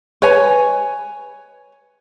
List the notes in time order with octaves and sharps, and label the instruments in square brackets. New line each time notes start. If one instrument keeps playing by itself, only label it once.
[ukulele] B4 C#5 G#5